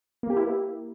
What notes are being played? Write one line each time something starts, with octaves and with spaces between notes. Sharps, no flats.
A#3
G4
E4
A#3